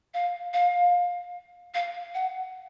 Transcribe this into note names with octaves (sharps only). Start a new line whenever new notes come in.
F5
F5
F5
F#5